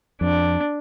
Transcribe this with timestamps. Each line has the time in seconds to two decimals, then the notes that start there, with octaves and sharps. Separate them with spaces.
0.21 F2 D4